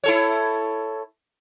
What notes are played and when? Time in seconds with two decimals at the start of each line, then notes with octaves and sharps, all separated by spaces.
0.04 E4 A4 C#5